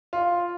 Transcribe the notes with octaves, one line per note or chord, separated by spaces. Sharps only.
F4